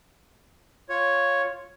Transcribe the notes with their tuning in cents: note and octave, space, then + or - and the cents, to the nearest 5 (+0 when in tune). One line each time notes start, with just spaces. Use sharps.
F4 +5 C#5 +0